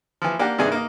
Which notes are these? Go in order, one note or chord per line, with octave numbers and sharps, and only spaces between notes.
E3 F3
A#3 D4 G4 F#5
G2 C3 D#3 D4 G#4 G#5
A#3 D#4